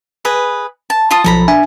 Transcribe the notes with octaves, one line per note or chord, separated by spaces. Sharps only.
G#4 B4 D#5
A5
F4 A5 D#6
B1 F3 A4 A#5 B5
D4 E5 G#5